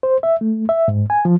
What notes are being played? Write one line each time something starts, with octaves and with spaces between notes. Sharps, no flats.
C5
E5
A3
E5
G#2
G#5
F3